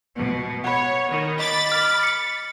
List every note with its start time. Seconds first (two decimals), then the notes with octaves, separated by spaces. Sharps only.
0.17 B2
0.64 C#5 F#5 B5
1.10 D#3
1.39 D#5 B5 D6 A6
1.72 F6
2.03 C#7